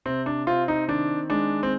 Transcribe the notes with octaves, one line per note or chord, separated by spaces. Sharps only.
C3 C4
D4
C4 F4
D#4
D#3 D4
G#3 D4
C4